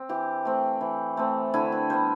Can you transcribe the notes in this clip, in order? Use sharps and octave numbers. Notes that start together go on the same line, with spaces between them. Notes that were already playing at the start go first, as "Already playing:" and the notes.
Already playing: C4
E3 G4
A3 C4
E3
A3 C4
D3 E4
B4
G3 B3 C5